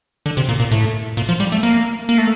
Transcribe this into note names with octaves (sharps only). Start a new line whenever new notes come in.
D3
C3
A#2
A#2
A2
A#2
F3
G3
A3
A#3
A#3
A3